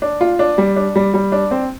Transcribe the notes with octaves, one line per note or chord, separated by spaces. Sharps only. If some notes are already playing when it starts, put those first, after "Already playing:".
D4
F4
D4
G3
D4
G3
G3
D4
C4